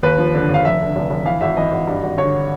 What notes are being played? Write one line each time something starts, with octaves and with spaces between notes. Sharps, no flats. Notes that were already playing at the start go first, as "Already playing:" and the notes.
D#2 B4
F3
D3
D#2
F5
F1 E5
D3
F1
F1
E3 F5
G#1 E5
E3 D#5
G#1
G2
G#1
D3 C#5